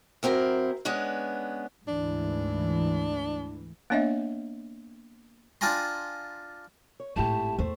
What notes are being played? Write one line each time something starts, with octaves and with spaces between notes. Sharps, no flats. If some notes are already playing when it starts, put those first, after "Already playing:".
F#2 C4 E4 G#4 A#4
G#3 B3 C#4 D4
D2 G#2 E3 D4
A#3 B3 D4 C#5 D#5 E5
D4 F4 G5 G#5 A#5 C6
C#5
G#1 A2 A3 E4 G4 A5
E2 A3 C5